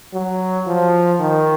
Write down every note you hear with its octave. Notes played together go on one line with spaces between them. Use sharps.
F#3
F3
D#3